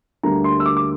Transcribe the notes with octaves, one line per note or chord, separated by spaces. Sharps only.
D2 D3 G3 A#3 A#5
C6
E6
D6
D6